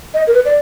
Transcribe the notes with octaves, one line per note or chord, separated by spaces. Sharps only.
D#5
A#4
B4
D5